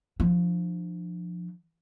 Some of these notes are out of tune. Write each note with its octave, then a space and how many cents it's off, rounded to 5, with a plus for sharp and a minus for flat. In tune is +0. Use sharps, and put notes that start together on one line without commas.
F3 +0 D4 +35